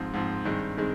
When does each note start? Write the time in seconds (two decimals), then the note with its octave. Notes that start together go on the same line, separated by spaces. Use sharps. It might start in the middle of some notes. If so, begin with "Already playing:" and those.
Already playing: G#2 F3 C4
0.14 G#2 F3 C4
0.45 G2 D#3 G#3 C4
0.77 D#3 G#3 C4